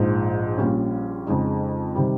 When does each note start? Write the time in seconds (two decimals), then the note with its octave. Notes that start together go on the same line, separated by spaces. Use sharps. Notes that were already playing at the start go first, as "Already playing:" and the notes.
Already playing: A#1 G#2 F3
0.58 A#1 A#2 G3 C#4
1.27 F2 C#3 G#3 D#4
1.95 C3 D#3 G3